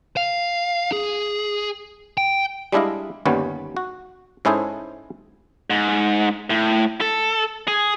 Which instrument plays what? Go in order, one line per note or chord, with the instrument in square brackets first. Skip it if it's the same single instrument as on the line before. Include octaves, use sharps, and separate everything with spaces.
[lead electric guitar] F5
G#4
G5
[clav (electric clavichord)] G3 G#3 D4 E4 D#5 F5
G1 D#2 G3 C#4 B4 F#5
F#4
G#2 C#4 E4 G#4 A4 C5
[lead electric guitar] G#2
A2
A4
G#4